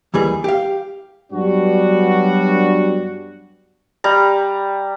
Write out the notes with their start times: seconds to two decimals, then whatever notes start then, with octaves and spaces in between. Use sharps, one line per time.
0.14 D#2 E3 G3 G#4
0.44 G4 F5
1.33 G2 F#3 G3 B3 D4 F#4
4.04 G3 A#5